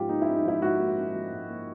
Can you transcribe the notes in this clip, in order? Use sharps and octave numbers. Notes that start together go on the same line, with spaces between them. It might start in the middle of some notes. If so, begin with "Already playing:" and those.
Already playing: G#2 F3 C#4 F4 G4
A#3 D#4
E4
C#4
D#4
F3 E4
G#2 F#4
A#3
C#4
F3
G#2
A#3